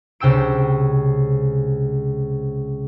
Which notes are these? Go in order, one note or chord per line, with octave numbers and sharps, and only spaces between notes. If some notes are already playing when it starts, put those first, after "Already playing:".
C#2 C3 G5 E6 D7